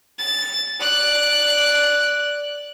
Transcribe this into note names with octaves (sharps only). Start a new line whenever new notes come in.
A6
D5 F#6